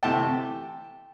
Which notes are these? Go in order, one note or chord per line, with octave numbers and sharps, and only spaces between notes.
C3 E3 A3 G5 A5